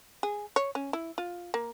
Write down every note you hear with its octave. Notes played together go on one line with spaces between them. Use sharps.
G#4
C#5
C#4
E4
F4
A#3